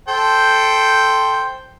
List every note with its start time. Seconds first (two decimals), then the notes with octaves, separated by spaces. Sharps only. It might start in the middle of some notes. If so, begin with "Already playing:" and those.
0.08 A4 C5 G5